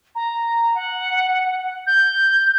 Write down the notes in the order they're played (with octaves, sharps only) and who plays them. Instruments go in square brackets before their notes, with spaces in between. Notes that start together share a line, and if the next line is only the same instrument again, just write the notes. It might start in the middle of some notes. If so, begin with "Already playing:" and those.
[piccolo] A#5
F#5
G6